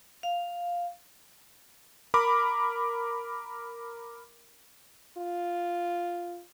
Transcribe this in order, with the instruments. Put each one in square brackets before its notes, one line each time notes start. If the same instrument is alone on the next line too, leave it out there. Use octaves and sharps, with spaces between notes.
[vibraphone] F5
[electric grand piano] A#4 B5 D6
[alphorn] F4